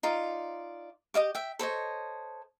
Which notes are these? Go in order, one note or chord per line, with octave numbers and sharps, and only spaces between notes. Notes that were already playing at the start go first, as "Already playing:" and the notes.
D#4 F4 D5
G4 D#5 F5 D6
E5 G5
A4 C5 C#5 D#5